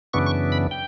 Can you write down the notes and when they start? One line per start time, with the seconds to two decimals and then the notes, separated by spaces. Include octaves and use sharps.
0.13 F#2 C#3 E3 B3 D4 C#6
0.26 C#6
0.52 B5
0.71 G5